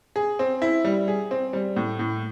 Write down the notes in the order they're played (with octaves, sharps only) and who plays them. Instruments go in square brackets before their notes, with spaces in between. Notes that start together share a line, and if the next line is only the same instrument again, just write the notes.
[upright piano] G#4
C4
E4
G3
G#4
C4
G3
A2
A2